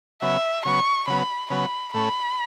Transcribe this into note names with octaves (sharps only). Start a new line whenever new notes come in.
C#3 F#3 B3 E5
C#3 F#3 B3 C#6
C#3 F#3 B3 B5
C#3 F#3 B3 B5
A2 A3 C#4 B5